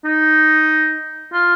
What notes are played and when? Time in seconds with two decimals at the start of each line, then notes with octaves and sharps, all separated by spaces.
0.05 D#4
1.33 F4